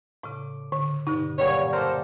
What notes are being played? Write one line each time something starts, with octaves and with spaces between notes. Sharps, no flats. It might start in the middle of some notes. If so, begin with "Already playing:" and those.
A2 C#3 D6
D3
G2 B2 D3 D#4
A#2 F#3 G3 B4 C#5
A4 A#4 C5 F5 C#6 D6